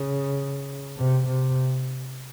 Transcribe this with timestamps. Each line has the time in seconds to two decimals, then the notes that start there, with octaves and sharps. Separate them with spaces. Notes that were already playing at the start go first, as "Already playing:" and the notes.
Already playing: C#3
0.98 C3
1.27 C3